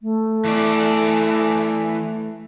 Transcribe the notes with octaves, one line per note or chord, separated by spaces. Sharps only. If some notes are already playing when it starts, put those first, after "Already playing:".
A3
E3 D5